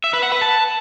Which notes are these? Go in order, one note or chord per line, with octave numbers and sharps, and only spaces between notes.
E5
B4
F#5
B4
A5